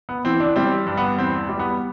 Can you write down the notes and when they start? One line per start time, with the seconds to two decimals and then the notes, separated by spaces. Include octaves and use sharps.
0.09 B3
0.25 E3 C4
0.40 D4
0.56 G3 C4
0.87 G2
0.97 B3
1.18 E2 C4
1.49 G3
1.59 B3